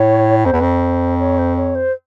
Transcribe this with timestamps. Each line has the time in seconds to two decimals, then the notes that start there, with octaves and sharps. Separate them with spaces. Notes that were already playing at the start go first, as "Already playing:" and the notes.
Already playing: A2 C#5
0.45 F2 C5
0.53 E2 B4
0.61 F2 C5
1.19 C#5
1.38 C5
1.57 C#5
1.75 C5